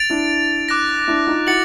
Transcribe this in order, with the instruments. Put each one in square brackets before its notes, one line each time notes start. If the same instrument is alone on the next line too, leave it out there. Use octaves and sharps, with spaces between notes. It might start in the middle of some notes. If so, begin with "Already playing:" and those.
Already playing: [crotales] A6 D7 F7
[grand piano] D4 E4
[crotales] D6 F#6 A#6
[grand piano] D4 E4
D#4 F4
[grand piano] E4 F#4 [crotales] A6 C#7 F#7